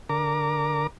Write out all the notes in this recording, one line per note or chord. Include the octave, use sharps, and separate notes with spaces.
D3 A#4 A#5 D6